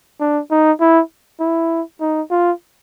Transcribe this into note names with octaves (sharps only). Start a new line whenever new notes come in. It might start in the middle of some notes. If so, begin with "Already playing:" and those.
D4
D#4
E4
E4
D#4
F4